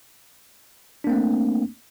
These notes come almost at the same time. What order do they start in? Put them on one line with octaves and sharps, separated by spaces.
D4 A#3 C4 A3